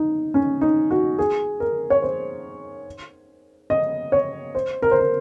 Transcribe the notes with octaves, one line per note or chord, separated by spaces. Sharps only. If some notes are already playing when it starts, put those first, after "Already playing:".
Already playing: D#4
C#4
D#4
F#4
G#4
A#4
C#5
C5
D#5
C#5
C5
A#4
C5
A#4